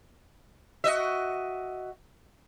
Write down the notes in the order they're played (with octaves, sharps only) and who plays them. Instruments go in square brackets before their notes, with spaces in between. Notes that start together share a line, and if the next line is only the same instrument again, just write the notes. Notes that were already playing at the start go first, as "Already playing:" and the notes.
[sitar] F#4 D#5 E5